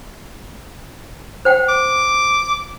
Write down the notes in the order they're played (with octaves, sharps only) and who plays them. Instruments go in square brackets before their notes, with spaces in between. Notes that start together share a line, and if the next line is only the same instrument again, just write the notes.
[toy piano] C5 F#5 G5
[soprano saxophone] D6